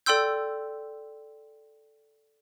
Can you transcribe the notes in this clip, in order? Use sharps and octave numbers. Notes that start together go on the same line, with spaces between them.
A4 D5 G5 C6 E6 G6